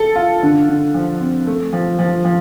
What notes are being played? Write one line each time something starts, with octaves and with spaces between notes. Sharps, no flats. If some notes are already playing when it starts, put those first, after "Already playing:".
Already playing: A4
F4
D3
D3
F3
C4
A3
F3
F3
F3